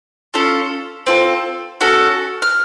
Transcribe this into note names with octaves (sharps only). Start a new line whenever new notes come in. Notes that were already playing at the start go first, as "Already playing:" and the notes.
C#4 F4 A4
C4 F4 A4
C#4 F#4 A4
F6